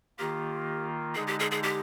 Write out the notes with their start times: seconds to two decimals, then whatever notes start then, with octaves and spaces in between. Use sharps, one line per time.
0.18 D#3 A#3 F4 G4
1.15 D3 G#3 D#4 G#4
1.27 G4
1.40 G#4
1.51 G#4
1.63 G4